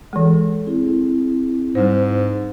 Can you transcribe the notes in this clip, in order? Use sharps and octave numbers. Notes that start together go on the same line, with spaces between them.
E3 G#3 G#4 A4
C4 E4 G#4
G#2 G3 C5